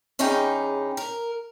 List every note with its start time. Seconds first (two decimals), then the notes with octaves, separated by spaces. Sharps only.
0.19 E2 C#4 D#4 G4 G#4 G5
0.97 A#4